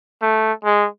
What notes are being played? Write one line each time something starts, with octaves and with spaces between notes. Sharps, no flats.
A3
G#3